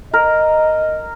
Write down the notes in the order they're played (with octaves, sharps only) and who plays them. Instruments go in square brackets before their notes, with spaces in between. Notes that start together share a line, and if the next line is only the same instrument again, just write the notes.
[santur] A#4 [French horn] D#5